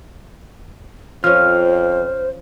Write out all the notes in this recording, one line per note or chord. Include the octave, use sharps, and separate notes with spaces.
F2 F3 C#4 C5 F6